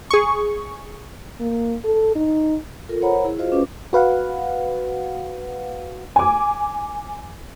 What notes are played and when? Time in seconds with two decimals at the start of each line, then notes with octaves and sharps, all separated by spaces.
0.10 G#4 C#6
1.40 A#3
1.84 A4
2.15 D#4
2.89 F4 A4 A#4
3.02 A#4 C5 C#5 F#5 A#5 B5
3.25 E4 G#4
3.38 F4 F#4 G#4 C5 D#5 F5
3.52 C#4 B4 D6
3.93 F#4 B4 F5 F#5
6.16 G#5 D6